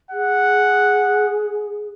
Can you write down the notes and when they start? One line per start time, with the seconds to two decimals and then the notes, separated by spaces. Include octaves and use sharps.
0.11 G#4 F#5